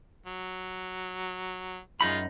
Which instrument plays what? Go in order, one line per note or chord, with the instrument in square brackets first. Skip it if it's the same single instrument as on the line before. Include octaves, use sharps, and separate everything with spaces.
[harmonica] F#3
[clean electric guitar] F#2 D#4 B5 [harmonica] G#3 F4